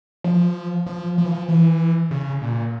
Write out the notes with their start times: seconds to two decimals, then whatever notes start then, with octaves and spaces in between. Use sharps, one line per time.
0.24 F3
0.86 F3
1.18 F3
1.25 E3
1.32 F3
1.49 E3
2.11 C#3
2.42 A#2